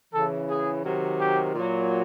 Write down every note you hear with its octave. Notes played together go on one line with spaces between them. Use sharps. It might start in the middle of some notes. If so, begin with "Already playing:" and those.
C#3 E3 A4
G#4
C3 D#3 F#3
G4
A#2 F#3